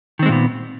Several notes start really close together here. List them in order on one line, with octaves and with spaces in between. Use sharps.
D#3 C4 G#3 A#2 B3